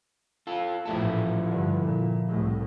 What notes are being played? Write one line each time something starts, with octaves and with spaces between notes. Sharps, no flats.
F4 A4
A1 A#2 F3 E4 A4
G2 D3
A#2
C2 A2